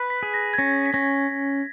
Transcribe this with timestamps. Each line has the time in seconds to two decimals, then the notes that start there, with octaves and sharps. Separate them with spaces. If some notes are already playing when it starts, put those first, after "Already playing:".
Already playing: B4
0.10 B6
0.23 G#4
0.34 A#6
0.54 G#6
0.58 C#4 A#6
0.86 B6
0.94 C#4 A#6